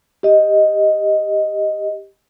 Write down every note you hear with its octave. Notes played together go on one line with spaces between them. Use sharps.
G4 D#5